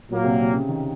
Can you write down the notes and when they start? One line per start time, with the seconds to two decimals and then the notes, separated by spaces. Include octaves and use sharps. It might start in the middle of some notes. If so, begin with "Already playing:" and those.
0.10 A#2 F#3 A#3
0.24 C3
0.39 C3
0.54 C#3
0.69 D#3